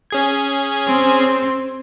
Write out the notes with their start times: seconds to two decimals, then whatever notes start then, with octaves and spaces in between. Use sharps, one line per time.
0.10 C#4 G#4 G#6
0.88 C4